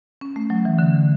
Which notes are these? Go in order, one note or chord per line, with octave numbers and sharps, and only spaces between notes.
C#4
A3
F#3
E3
D3